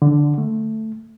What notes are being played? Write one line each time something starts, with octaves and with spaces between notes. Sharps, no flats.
D3
A3